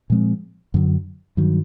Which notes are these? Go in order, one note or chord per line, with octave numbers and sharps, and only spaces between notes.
A#2 F3 G#3 C4
F#2 D3 F#3
G2 D#3 F#3